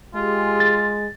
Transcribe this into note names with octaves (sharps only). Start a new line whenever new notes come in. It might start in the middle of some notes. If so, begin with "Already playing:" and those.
G#3 F4 G4 G#4
A6